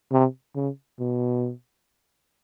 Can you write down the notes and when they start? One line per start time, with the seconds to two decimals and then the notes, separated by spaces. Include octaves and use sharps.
0.12 C3
0.56 C#3
0.99 B2